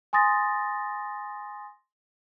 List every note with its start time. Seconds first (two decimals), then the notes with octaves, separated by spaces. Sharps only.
0.13 G#5 C6 D#6 A6 A#6